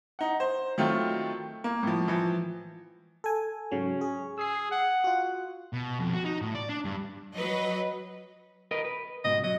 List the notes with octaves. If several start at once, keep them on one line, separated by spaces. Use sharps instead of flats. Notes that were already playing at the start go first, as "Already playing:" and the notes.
D#4 F#5
C5
D#3 F#3 A3 C4 F4
A#3
A2 F3
E3 F3
A4 G#5
G#2 C#3 F#3 C#4
G#4
G#4 E6 C7
F#5
F4 F#4
B2
F2
F#4
D#4
A2
D5
D4
G2
F#3 B4 D#5
A#4 B4 D#5
B4
C#2 G#2 B2 D#5
F#3 D#5